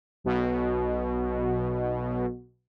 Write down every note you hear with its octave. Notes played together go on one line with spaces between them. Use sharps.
B1 B2